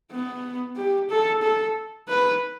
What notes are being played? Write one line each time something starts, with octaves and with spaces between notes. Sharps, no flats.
B3
G4
A4
A4
B4